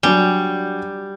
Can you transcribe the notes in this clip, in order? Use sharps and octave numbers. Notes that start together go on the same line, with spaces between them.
F#3 G3 D4 G#5